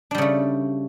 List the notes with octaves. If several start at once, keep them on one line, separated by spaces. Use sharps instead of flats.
C#3 G3 A3 D4